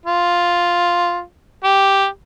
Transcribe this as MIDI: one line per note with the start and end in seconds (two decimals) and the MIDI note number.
0.05 1.22 65
1.64 2.06 67